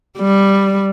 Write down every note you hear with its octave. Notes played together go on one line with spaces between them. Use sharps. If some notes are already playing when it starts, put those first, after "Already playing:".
G3